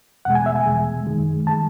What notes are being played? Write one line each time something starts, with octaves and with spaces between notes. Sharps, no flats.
E2 B2 G#3 F#5
G#5
E5
G#5
E2 B2 G#3
F#2 D#3 G#3
D#3 G#3 A5